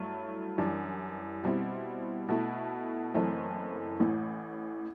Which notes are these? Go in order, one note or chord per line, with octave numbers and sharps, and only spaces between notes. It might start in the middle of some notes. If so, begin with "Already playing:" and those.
Already playing: G2 F#3 A3 E4
F#2 E3 G3 D4
B2 G3 C4 E4
B2 A3 E4
F#1 F#2 E3 A3 C4
A1 A2 E3